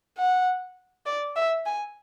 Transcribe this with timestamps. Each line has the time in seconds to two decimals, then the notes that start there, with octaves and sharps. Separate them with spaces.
0.18 F#5
1.06 D5
1.36 E5
1.66 G#5